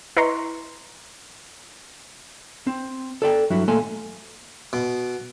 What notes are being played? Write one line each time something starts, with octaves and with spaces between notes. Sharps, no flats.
E4 B4 D#5 A#5 C6 C#6
C4
A4 D5 G5
G2 F#3 E4
A#2 A3 A#3 A4 G#5
B2